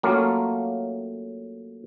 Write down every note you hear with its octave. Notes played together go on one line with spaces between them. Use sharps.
F#3 A3 A#3 C#4 F4